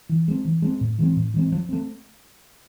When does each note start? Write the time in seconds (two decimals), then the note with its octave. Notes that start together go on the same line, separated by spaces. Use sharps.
0.09 E3
0.28 G#3 C4
0.45 E3
0.62 G#3 C4
0.81 A2
0.98 E3 G#3 C4
1.16 A2
1.34 E3 G#3 C4
1.52 F3
1.69 A3 C4